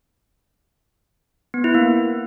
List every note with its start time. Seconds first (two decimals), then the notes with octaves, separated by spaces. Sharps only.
1.54 B3
1.64 E4
1.74 A#3